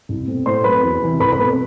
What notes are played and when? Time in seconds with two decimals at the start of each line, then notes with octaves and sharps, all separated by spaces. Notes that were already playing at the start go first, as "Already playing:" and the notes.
0.09 C2
0.27 B2 A3 C4
0.46 A2 C5 C6
0.64 F#3 A3 C4 B4 B5
0.83 E2
1.02 C3 E3
1.20 C2 B4 B5
1.32 B4 B5
1.39 B2 A3 C4